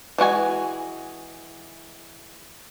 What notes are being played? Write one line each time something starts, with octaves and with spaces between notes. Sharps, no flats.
E3 G#3 F#4 G#5